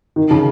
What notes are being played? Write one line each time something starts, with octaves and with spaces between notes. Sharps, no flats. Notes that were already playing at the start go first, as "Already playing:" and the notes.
D#3
C#3